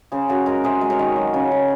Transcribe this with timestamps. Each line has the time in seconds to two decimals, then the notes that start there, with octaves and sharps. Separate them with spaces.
0.12 C#3 G#4 C5
0.29 C#3 F#4 A#4
0.46 G#3 F#4 A#4
0.64 C3 G#4 C5
0.81 G#3
0.90 A#4 C#5
0.99 D#3
1.16 F#3
1.34 C#3
1.51 F#3